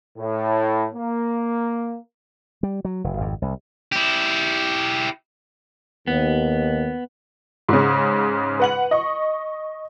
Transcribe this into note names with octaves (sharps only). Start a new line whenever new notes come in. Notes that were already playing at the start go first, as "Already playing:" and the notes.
A2
A#3
G3
F#3
F1
G#1 F2
C2
E4 G4
D#2 B3
G#2 C#3
B4 F#5 F#7
D#5 C#6